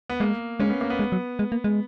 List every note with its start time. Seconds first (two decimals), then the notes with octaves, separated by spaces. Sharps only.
0.09 B3
0.20 G#3 A#3
0.60 G#3 C#4
0.70 B3
0.81 A#3
0.90 B3
0.99 G#3
1.12 F#3
1.39 G#3
1.52 A#3
1.64 G#3